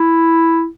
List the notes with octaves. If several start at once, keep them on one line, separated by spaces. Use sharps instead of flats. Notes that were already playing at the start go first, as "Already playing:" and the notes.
Already playing: E4